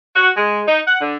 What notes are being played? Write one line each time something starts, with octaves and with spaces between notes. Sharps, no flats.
F#4
G#3
D#4
F#5
D3